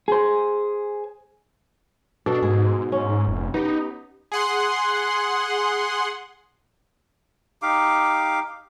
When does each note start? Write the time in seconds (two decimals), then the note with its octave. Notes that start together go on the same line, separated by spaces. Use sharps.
0.08 G#4 C5
2.26 B2 D4 A4
2.42 G#2 G#4
2.92 C#4
3.28 F1
3.54 B3 D#4 G4
4.32 G#4 F#5 C6
7.62 D#4 G4 F5 D6